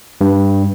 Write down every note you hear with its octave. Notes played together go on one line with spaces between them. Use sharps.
G2